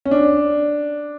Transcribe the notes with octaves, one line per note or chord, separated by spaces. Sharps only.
C#4
D4